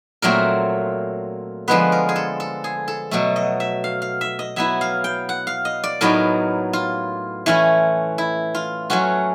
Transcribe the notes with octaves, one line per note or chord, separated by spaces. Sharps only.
A#2 F#3 A3 C4 A#4
D3 F3 G#3 B3 B4
A#4
G#4
A4
A4
G#4
A4
B2 F#3 A3 A4
D#5
E5
F5
F5
E5
D#5
F#3 B3 E4 E5
F5
G5
F#5
F5
D#5
D5
A2 F#3 B3 D#4 A#4
F4
E3 A3 C#4 E4
E4
F4
F#3 A3 C#4 F#4